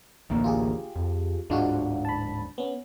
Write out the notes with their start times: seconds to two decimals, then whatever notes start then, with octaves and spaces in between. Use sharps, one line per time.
0.30 A1 D2 A#3
0.44 F4 G4 G#4
0.96 F2
1.50 D1 G#2 G#3 D4 F4 F#4
2.05 A5 B5
2.58 B3 C#4